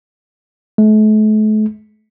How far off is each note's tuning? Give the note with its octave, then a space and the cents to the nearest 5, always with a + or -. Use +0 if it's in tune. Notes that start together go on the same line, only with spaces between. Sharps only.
A3 -40